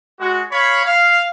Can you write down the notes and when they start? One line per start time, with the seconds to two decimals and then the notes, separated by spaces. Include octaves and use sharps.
0.20 G#3 F#4
0.51 C#5 F5 B5
0.86 F5